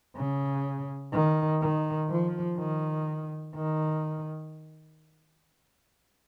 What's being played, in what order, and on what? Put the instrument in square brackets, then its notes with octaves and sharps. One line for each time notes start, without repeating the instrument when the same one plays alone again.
[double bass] C#3
D#3
D#3
F3
D#3
D#3